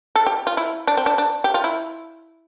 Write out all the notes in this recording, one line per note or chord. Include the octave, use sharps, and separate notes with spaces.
A4
G4
F4
E4
D4
C4
D4
D4
G4
F4
E4